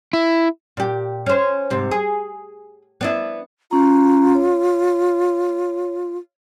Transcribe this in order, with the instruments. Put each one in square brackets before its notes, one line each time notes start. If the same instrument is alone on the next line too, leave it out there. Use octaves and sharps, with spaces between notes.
[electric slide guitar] E4
[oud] A#2 G4
C#4 C5
G#2 C3
G#4
B3 D4 E4
[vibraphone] C#4 A#5 [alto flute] F4
[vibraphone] C#5